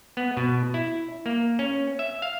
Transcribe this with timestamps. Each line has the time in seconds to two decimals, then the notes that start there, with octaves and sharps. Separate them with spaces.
0.17 B3
0.37 B2
0.74 E4
1.26 A#3
1.59 C#4
1.99 E5
2.22 F5